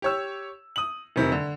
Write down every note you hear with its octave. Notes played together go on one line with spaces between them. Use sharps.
G4 C#5 E6
D#6 F#7
F1 C3 D#3
D3